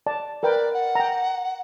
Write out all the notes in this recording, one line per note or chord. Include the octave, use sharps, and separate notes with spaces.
D5 A5
A#4 B4 D5 G5
F#5
G5 A#5